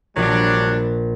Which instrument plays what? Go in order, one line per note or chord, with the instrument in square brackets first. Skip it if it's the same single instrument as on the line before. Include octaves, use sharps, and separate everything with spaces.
[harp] A#1 [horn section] F#3 G3 D4